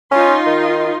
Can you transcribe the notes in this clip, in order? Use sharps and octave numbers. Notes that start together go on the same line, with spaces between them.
C#4 D#4 F4 C6
D#3